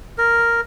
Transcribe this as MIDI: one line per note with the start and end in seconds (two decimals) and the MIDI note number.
0.18 0.61 70